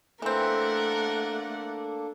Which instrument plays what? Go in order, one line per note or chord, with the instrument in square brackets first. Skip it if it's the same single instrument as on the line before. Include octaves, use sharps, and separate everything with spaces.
[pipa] E3 C4 [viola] A3 F#5 [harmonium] A#3 D4 A4 [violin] A#4